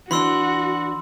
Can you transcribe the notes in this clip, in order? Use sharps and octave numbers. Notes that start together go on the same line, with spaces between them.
E3 D4 F#4 B5 C6 E6